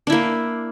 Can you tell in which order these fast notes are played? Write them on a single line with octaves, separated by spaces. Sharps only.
D4 E4 A#3